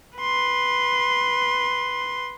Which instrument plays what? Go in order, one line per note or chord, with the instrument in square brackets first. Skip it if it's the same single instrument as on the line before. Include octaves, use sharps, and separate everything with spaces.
[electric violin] B4 C6